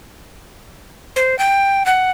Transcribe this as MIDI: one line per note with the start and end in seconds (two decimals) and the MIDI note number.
1.16 1.38 72
1.39 1.84 79
1.86 2.11 78